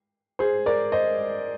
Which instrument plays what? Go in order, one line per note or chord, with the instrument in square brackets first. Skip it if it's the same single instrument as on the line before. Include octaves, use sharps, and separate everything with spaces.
[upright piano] G#4 C5
A#4 D5
C5 D#5